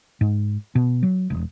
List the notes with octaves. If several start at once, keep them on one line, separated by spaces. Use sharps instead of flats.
G#2
B2
F#3
E1